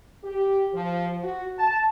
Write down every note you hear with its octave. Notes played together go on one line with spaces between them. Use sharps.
G4
F3
F#4
A5